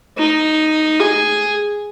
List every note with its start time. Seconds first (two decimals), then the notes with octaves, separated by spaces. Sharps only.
0.18 D#4
1.00 G#4